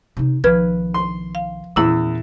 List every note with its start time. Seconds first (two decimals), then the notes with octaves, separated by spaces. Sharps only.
0.17 C3 D#4
0.44 B1 D#3 F3 B4 F6 G#6
0.94 C6
1.35 F5
1.76 E2 A#2 C#4 E4 E6